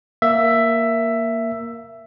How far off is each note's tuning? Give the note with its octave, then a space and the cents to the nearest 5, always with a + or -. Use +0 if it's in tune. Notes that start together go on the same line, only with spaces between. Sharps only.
A#3 +0 E5 +10